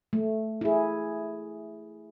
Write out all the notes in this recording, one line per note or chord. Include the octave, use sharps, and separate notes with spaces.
A3
E4 G#4